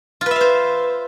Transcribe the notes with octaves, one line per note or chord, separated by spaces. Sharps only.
F4 B4 C5 E5 F5